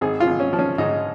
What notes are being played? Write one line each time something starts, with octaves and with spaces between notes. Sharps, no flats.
G#1 G#4
F4
G#1
C#4
F3
C#4
G#2 D#4